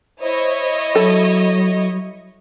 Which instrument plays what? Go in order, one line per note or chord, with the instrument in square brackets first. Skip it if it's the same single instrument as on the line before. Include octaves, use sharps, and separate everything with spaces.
[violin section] E4 C#5 D#5 [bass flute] C5
[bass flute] F#3 [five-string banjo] A4